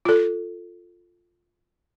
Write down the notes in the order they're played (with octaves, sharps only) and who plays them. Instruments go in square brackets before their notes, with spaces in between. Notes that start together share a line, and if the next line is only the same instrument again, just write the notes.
[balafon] F4 A4